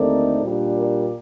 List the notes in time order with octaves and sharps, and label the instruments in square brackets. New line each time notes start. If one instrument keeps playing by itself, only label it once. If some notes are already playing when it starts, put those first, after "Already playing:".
Already playing: [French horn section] D#2 D3 A3 C4 D#4 A#4 D5
A#2 G3 D4
A#4 D5